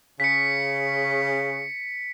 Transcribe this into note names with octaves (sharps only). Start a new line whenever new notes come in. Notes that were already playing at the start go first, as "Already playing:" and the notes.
C#3 B6 C#7